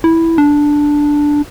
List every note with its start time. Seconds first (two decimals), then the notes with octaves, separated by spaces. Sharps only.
0.04 E4
0.38 D4